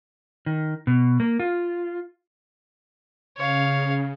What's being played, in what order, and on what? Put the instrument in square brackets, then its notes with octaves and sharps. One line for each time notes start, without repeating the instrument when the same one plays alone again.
[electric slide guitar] D#3
B2
A#3
F4
[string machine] C#3 [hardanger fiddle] C#5 F5